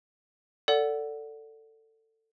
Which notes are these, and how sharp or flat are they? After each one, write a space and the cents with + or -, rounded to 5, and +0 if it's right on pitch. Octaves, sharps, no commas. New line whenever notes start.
A4 +20 D5 -15 F#5 +0